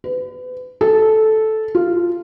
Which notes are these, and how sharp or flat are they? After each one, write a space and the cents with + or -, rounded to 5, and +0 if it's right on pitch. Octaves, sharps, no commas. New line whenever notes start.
B4 +35
A4 -10
F4 -10